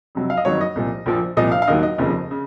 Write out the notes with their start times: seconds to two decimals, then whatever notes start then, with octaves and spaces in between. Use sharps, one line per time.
0.15 F2 C3 F#3
0.30 F5
0.37 D#5
0.45 F#1 F2 D#3 F#3 C#5
0.61 D#5
0.75 C2 A#2 F3
1.06 A#1 A#2 F3
1.37 C2 A#2 F3 D#5
1.52 F5
1.62 F5
1.67 D#2 D#3 F#3 D#5
1.83 D#5
1.98 F1 D#2 C#3 F3
2.31 C#3